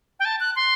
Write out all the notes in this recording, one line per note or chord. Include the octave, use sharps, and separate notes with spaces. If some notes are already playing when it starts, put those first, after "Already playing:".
G5
A5
F#6
C6